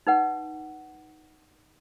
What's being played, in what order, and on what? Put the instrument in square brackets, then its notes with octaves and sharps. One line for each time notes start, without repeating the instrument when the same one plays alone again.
[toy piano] D#4 B4 F#5